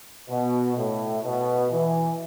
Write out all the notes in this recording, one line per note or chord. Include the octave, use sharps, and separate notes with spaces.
B2
A2
B2
E3